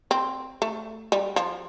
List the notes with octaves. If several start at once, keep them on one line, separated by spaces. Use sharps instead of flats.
C4
A3
G3
F3